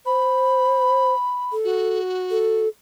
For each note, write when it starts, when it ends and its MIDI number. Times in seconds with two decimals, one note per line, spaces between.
0.06 1.14 72
0.06 1.54 83
1.52 2.00 69
1.64 2.66 66
2.31 2.68 69